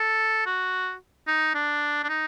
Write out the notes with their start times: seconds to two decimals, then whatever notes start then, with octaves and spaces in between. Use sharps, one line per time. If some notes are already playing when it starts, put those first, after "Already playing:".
Already playing: A4
0.46 F#4
1.27 D#4
1.54 D4
2.04 D4
2.09 D#4